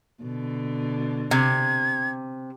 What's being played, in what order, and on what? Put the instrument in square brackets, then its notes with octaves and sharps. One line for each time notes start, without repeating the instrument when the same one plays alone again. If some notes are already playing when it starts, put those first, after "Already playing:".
[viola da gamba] B2 D3
[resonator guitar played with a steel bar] C3 [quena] G#6